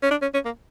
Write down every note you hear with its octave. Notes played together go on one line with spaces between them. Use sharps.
C#4
D4
C#4
C#4
A#3